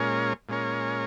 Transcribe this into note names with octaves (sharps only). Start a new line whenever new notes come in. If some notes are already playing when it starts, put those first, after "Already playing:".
Already playing: A#2 G#3 C#4 A#4 C#5
A#2 G#3 C#4 A#4 C#5